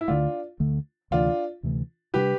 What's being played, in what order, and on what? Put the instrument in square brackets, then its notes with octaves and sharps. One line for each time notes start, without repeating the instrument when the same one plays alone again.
[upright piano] E4
[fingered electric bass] D2 D3 A3 [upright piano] D4 F4
[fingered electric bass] D2 D3 A3
[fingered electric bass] D2 C3 E3 A3 [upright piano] D4 F4
[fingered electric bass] D2 C3 E3 A3
[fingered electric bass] C3 G3 B3 D4 [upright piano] G4 B4